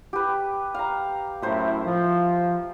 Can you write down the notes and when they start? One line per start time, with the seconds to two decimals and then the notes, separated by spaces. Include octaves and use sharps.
0.13 G4 B4
0.74 F5 A#5
1.42 F#2 A2 E4 C5 E5
1.84 F3